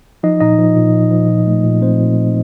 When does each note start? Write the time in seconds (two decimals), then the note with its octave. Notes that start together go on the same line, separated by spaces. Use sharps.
0.23 F3 D#4 D#5
0.40 A#2 D#4 D#5
0.58 F3
0.76 A#2
0.94 F3
1.11 F3
1.29 A#2
1.47 A3
1.64 A#2
1.81 A3 C4 C5
1.99 A#2
2.17 A#2